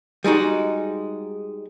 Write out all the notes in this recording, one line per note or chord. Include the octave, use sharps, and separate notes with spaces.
G3 G#3 D#4 F#4